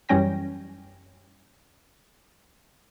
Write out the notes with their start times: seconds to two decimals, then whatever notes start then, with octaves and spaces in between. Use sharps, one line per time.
0.09 F#2 E3 G3 C#4 G5 A#6